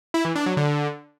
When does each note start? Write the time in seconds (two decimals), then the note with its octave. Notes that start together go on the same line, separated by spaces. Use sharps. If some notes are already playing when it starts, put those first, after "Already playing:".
0.14 E4
0.25 E3
0.36 D4
0.46 F#3
0.57 D3